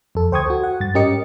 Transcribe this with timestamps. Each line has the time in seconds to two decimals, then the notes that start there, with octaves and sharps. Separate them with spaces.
0.15 F2 A4
0.32 D2 C5 G5 C#6 D#6 G#6
0.46 F#4 A4
0.64 F#5
0.80 G2 A6
0.95 G#2 C#4 G4 A#4 D#5 C#7